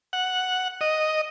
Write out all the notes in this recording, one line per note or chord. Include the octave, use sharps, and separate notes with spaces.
F#5
D#5